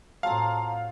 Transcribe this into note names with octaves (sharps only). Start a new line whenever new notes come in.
A2 F#3 C4 F4 F5 A5 A#5